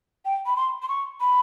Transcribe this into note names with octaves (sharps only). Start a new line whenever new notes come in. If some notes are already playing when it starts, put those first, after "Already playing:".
G5
B5
C6
C6
C#6
B5